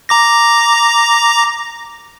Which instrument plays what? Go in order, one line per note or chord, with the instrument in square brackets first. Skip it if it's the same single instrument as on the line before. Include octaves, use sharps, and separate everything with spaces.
[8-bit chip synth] A#5 D6 A#6